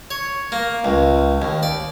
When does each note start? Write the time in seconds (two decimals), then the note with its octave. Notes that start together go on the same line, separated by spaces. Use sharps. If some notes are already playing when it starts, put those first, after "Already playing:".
0.11 C#5
0.52 A#3
0.84 C#2
1.42 D#2
1.63 D5